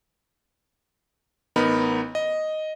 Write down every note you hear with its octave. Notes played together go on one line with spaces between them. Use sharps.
A1 B3 D#4 A#4 B5
D#5